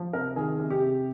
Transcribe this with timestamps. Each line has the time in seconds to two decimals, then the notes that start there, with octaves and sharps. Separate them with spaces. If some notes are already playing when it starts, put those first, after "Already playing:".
Already playing: F3
0.13 C3 A#4
0.36 D#3 G#4
0.59 C3
0.70 G4
0.82 C3